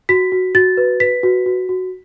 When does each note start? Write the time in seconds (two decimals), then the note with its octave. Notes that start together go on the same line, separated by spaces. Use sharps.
0.09 F#4 B6
0.32 F#4
0.55 F#4 A6
0.77 B4
1.00 B4 B6
1.23 F#4
1.46 F#4
1.69 F#4